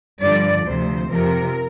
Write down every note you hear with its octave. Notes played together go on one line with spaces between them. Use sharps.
G2 D3 F3 D5
D2 C3 F3 C5
F2 C3 F3 A#4